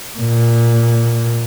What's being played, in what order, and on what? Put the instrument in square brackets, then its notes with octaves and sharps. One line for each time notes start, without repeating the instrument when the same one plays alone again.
[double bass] A#2